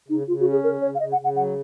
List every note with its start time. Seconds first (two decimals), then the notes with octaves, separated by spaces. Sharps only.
0.08 C#3 D#4
0.27 C#3 F4
0.39 F#4
0.45 C#4
0.51 G#4
0.63 C#3 A#4
0.81 C#3 C#5
0.94 F5
0.99 C#3 D#5
1.11 F#5
1.17 C#3
1.23 F#5
1.35 F#3 F#5